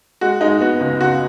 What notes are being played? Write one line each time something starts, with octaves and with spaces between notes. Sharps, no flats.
G#3 F#4
G#3 D#4
B3 F#4
C#2
C#3 F#4